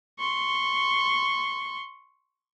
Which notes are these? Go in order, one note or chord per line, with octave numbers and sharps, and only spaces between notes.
C6 C#6